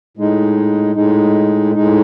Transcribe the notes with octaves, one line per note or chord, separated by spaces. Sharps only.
A2 G#3 D#4
A2 G#3 D#4
A2 G#3 D#4